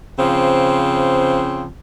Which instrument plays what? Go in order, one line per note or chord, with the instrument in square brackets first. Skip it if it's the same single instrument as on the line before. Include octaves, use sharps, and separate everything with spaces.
[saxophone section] C#3 F3 C4